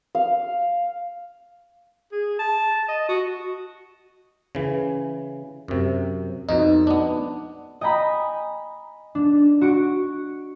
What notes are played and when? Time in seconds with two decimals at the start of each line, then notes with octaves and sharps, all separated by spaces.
0.15 F5
2.12 G#4
2.39 A5
2.88 D#5
3.08 F#4
4.55 C#3 E3
5.68 F#2 C3
6.49 F2 B2 D#4
6.87 B3 D4
7.81 D#5 G5 G#5 A#5 B5
9.15 D4
9.61 F#4 C#6 D7